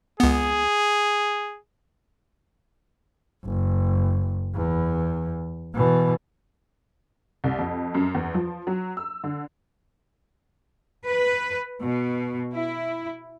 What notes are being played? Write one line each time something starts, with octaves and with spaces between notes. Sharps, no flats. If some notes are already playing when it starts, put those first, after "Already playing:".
C#2 B3 G#4
F#1
E2
B2 E3
C2
F2
F#2
E2
F3
F#3
E6
D3
B4
B2
E4